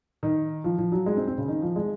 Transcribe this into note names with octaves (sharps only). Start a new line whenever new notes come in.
D#3
F3
F3
F#3
G#3
C4
C4
C#3
D#3
F3
G#3